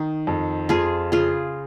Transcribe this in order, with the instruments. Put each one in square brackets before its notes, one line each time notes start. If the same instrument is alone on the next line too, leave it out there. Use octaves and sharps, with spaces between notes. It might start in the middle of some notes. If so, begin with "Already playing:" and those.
Already playing: [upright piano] D#3 [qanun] D#4
[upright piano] F2
[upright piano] F2 [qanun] F4 G#4
[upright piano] C#3 [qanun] F4 G#4